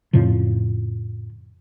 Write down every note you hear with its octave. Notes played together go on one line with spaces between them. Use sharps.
F2 A2 C#3 F3